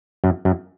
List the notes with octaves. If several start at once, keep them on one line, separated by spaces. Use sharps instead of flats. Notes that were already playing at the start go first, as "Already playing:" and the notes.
F#2
F#2